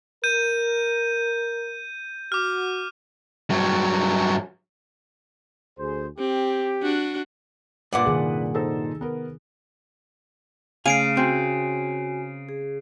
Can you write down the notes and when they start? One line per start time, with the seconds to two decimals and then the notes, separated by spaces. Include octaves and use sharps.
0.24 A#4 G6 D#7
2.32 F#4 D6 F6
3.50 G2 F#3
5.79 D2 G#4 C5
6.19 C4 G4
6.82 D4 F#4
7.93 G2 A#2 B4 D5 F#5 D6
8.06 C3 D#3 G#4
8.54 D#4 A4 C5
9.01 B3 A#4
10.86 C#3 A3 F5 G#5 C7 D7 D#7
11.17 C4 F#4 G#5
12.49 G#4